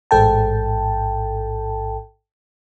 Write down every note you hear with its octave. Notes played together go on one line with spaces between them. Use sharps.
A1 G#2 A4 G5 A5